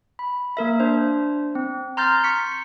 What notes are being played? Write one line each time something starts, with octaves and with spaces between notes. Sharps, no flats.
B5
A#3 A#4 E5
D4 C5
C4
A#5 C6 F6 G6 A6
C#6 B6 C#7